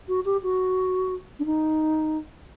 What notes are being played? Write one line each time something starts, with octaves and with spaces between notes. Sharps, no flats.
F#4
G4
F#4
D4
D#4